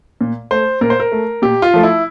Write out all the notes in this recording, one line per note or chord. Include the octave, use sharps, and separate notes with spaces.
A#2
A3 C5
A#2 A#4
C5
A#4
A3
A#2 G4
F4
F3 A3
E4